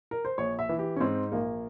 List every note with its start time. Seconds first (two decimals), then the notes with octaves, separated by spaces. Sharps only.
0.11 A#4
0.25 C5
0.38 A#1 C#5
0.59 E5
0.69 E3
0.79 G4
0.96 C#4
1.00 G#2 C4
1.32 A#1 A#3